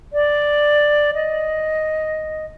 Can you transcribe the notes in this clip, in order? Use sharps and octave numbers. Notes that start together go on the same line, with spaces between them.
D5
D#5